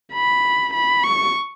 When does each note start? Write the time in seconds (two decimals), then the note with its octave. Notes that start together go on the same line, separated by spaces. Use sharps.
0.14 B5
0.74 B5
1.04 C#6